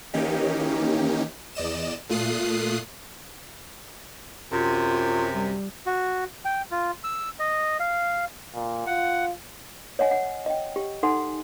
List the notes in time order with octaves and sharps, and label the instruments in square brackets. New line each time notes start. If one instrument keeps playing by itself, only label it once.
[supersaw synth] D#3 E3 A#3 C#4 D#4 G4
E2 D5 D#5 E7
A#2 A3 F4 D#6 F#6 C7
[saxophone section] F#2 C3 [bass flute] F4
[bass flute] G3
[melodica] F#4
G5
F4
E6
D#5
F5
[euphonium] A#2
[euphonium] F4 [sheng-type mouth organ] F#5
[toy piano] C#5 D#5 F#5 G#5
F#5
D#5 G5
G4
D#4 A4 F#5 G#5 C6